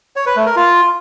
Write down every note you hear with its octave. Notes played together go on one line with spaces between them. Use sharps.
C#5
B4
A3
A#4
F4